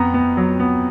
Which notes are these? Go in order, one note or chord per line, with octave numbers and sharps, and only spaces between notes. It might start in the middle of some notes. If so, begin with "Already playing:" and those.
Already playing: F2 B3 A#5
B3
F#3
B3